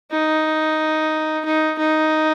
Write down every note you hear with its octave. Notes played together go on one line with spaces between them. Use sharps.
D#4
D#4
D#4